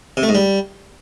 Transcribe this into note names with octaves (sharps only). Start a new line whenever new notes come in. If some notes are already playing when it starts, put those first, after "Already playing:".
C3
A3
G#2
G3